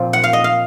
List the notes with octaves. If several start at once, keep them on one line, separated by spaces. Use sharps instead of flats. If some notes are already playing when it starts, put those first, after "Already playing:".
Already playing: A#2 F3 C4
F#5
F5
D#5
F5